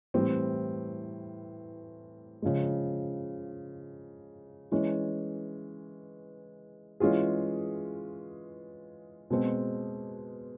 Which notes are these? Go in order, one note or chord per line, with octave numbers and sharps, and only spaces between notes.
A2 E3 G3 C4
C#3 F3 G#3
E3 G#3 C#4
E3 G#3 C#4 F4 G#4
B2 G#3 C4